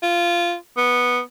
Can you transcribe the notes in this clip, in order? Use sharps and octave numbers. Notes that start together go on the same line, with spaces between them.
F4
B3